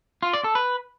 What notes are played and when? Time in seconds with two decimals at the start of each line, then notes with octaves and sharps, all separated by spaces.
0.23 F4
0.33 D5
0.44 A4
0.55 B4